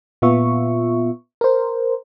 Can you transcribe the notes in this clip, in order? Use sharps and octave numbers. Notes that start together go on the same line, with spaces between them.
A#2 B3 F4 E5 C#6
A#4 C5